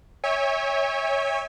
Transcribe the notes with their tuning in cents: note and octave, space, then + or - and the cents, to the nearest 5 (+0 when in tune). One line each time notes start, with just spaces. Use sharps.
C#5 +0 E5 -30 G#5 -45